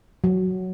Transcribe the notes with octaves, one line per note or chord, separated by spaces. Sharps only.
F#3